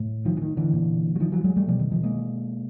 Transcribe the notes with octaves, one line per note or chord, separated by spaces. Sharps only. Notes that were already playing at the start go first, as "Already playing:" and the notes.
Already playing: A2
D#3 F3
E3
D#3
D3 E3
A#2
F#3
D#3 F3
E3 F#3
F#3 G#3
G3 A3
B2 F3 G3
D#3
D#3 F3
G#3 A#3